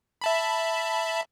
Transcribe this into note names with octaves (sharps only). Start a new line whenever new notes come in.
E5 A5 B5